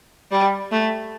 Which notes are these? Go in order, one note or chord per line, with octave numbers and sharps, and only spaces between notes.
G3
A3